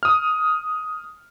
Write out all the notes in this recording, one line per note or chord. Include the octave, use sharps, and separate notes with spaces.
D#6 F6